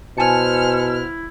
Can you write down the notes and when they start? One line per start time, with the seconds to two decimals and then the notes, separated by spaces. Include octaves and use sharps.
0.17 B2 E4 C5 G#5 A5 F6 C#7